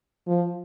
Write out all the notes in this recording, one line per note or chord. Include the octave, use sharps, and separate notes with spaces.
F3